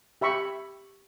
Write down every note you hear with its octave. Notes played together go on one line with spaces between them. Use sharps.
G4 E5 B5 C#6